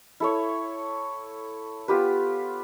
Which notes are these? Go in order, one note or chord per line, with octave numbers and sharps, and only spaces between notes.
E4 A4 C#5
B3 F4 G4 B4